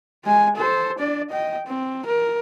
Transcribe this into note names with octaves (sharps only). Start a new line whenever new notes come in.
G#3 G#5
A4 C5
D4 D5
D#5 G5
C4
A#4